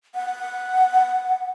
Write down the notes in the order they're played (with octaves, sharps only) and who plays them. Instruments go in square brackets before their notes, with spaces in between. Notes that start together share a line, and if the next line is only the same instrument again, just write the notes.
[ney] F#5